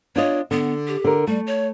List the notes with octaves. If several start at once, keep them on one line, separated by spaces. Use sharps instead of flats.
D4 F4 C#5 D#5
D3 B3
G4
D3 A#4
G3 A3
C#5